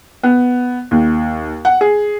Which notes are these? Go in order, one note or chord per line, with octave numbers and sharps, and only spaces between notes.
B3
D#2
F#5
G#4